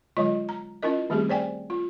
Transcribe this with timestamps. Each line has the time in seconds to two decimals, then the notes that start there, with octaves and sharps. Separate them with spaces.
0.17 D3 F#3 G#3 F4 C#5 D#5
0.49 A#5
0.83 C#4 E4 F4 A#4 D#5
1.10 D#3 G3 A3 C4 G4 G#4
1.29 C5 D5 G5 G#5
1.70 F4